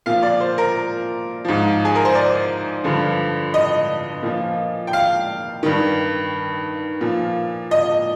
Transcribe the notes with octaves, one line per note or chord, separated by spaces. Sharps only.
A#2 F3 F5
D5
C5
A#4
G#2 F3
G#4
A#4
C5
D5
G2 D3 F3
D#5
A#2 F3
G5
F5
G2 D#3
A#2 F3
D#5